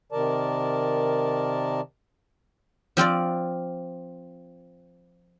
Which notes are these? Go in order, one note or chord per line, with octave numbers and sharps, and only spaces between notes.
C3 D#3 A#4 D5 A5
F3 C4 F4 D5